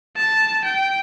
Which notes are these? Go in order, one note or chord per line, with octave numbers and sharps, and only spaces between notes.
A5
G5